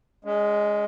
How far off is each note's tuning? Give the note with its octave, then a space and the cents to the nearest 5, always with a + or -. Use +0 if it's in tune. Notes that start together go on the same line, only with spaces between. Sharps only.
G#3 +0 C#4 +45